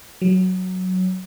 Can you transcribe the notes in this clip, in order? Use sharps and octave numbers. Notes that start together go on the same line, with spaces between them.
F#3